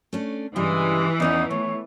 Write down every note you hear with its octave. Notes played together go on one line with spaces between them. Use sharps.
A3 C#4 D4
G2 C#3 E3 G3 G#3
E2 C#4 D#4 F#5
A3 C#5